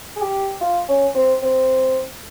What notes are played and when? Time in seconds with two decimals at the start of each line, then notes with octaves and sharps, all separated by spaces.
0.16 G#4
0.21 G4
0.61 F4
0.88 C#4
1.15 C4
1.42 C4